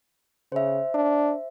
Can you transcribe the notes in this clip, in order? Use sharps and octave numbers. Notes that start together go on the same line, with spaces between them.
C#3 C5 E5
D4